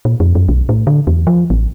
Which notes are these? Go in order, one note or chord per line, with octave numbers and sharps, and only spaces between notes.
A#2
F2
F#2
B1
A2
D3
E2
F3
A1